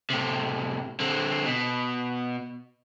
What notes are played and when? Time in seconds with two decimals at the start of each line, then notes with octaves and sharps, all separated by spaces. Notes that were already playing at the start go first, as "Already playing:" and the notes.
0.10 A2 C3
1.00 D3 C4
1.46 B2